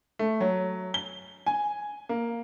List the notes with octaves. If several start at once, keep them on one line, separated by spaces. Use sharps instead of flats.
A3
F#3
G7
G#5
A#3